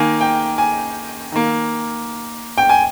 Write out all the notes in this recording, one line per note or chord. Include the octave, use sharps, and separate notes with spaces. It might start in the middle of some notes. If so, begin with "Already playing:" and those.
Already playing: D#3 A#3 G#5
G5
G#5
D#3 A#3
G5
G#5